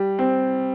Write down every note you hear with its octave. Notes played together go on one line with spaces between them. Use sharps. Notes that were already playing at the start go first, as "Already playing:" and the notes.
Already playing: G3
C4